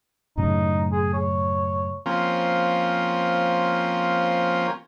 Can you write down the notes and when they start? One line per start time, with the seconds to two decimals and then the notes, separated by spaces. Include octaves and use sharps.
0.37 F#2 A2 C#3 D#4
0.92 G#4
1.14 C#5
2.06 F3 A#3 C4 C#4 F4